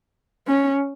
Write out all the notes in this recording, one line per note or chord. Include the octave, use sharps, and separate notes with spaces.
C#4